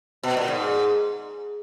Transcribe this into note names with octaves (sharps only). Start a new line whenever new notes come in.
B2
A#2
G#2